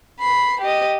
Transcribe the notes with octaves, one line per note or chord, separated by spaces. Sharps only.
B5 C7
G4 D#5